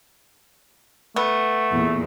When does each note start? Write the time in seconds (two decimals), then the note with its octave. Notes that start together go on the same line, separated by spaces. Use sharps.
1.16 A3 B3
1.72 E2 A#2